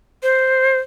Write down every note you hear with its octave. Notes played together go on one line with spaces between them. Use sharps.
C5